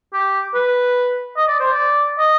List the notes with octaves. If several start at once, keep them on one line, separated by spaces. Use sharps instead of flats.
G4
B4
D#5
D5
C5
D5
D#5